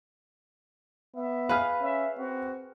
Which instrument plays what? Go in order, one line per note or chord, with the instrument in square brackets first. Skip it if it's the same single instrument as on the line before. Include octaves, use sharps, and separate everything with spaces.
[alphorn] B3 [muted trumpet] E5
[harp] G#4 B4 [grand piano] F5 F6
[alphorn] C#4 [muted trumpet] E5
[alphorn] C4 [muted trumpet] F#4